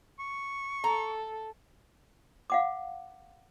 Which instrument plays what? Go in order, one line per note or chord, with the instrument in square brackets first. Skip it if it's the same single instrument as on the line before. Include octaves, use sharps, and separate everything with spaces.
[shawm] C#6
[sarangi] A4 [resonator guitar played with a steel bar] A#5
[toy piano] F5 F#5 D6